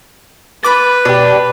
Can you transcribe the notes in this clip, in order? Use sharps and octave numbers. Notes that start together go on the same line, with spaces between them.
B4 B5 D6 A6
B2 D4 G4